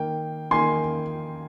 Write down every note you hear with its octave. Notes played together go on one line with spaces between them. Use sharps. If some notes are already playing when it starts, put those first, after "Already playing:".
Already playing: D#3 A#3 G5
D#3 A#3 G#5 C6